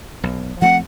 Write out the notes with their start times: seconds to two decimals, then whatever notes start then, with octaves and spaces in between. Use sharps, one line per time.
0.23 B1
0.62 F3 A3 C4 F#5